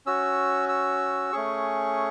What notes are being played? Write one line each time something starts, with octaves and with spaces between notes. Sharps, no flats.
C#4 F#4 E6
E6
A3 C#4 G#4 C#6